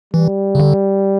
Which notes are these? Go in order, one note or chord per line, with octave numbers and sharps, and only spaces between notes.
E3 G3
C#3
D3